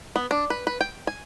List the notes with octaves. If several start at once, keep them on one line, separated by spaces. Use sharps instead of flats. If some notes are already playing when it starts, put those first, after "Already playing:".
B3
D4
B4
B4
G5
G#5